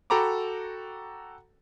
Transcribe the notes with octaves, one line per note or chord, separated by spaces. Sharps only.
F#4 A4 G5 A#5 B5 D6